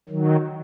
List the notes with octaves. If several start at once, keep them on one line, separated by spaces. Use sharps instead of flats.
D#3 F#3